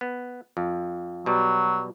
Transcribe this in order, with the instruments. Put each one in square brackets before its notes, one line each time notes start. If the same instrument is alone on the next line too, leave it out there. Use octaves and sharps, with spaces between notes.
[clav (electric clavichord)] B3
F2
[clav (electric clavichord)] B2 G3 [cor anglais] F#3